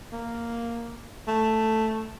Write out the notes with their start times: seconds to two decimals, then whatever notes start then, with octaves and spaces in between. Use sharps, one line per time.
0.12 A#3
1.28 A3